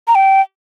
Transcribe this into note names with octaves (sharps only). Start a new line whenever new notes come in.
A#5
G5